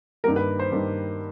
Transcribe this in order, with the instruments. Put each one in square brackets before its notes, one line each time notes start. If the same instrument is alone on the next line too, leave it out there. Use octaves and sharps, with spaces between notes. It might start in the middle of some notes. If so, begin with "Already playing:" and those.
[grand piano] G2 D#3 G3 A#3 A#4
B4
C5
G2 D#3 G3 A#3